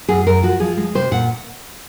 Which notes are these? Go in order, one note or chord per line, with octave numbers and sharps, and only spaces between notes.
F#2 G#4
F#2 A#4
F3 F#4
F3 G#4
G#3
C3 C5
A#2 F#5